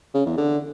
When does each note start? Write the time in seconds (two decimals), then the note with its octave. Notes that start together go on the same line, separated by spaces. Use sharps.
0.14 C#3
0.26 E2
0.37 D3